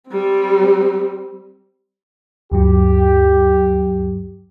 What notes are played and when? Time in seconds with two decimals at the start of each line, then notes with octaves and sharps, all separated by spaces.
0.10 G3 C4
2.52 D2 G2 F#3 G4